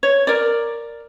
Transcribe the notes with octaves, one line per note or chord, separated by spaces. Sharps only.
C#5
A#4 D5